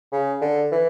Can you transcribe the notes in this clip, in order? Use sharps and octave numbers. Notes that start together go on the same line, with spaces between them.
C#3
D3
E3